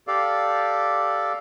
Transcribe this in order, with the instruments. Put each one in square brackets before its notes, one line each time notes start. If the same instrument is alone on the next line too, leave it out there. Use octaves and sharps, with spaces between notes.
[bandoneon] G4 A4 D5 F5